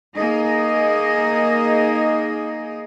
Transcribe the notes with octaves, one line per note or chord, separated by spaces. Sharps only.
A#3 D#4 G#4 D#5